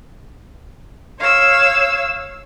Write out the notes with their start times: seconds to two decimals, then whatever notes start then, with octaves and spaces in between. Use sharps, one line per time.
1.18 C#5 F5 E6